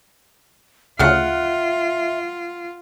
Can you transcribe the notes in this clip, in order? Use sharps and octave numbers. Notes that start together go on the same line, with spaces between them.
D2 C#3 F4 E5 F#5 F6